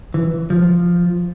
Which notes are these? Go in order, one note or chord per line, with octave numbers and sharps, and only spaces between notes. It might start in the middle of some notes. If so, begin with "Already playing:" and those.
E3
F3